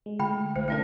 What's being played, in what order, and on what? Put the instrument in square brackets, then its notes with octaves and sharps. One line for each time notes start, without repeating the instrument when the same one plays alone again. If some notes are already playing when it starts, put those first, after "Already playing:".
[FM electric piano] G#3
[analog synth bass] D3 [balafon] A3 [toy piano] G5 B5
[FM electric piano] B1 [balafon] A3 [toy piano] C5
[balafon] A3 C#4 A#4 [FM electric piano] D4 E4 A4